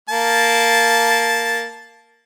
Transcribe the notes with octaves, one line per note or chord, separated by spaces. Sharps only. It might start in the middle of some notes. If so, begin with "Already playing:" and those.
A#3 A5